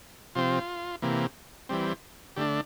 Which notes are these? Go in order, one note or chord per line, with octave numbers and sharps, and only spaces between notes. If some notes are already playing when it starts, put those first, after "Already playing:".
C3 F3 C4 F4
C3 E3 A#3
E3 G3 C4
D3 A3 D4 G4